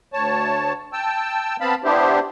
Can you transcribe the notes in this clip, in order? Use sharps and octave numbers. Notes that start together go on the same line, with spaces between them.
D2 C#5 A5
G5 A5 E6
B3 C4 F5 A5 B5
B3 D4 E4 G4 C5